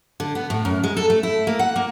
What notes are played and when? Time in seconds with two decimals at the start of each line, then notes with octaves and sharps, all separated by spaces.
0.20 D3
0.35 B3
0.50 A2
0.65 F#2
0.84 G#3
0.97 A4
1.10 A3
1.23 E4
1.47 A#3
1.59 F#5
1.76 A#3